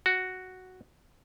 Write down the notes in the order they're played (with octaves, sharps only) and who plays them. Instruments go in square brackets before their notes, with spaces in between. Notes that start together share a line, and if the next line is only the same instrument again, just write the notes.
[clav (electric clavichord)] F#4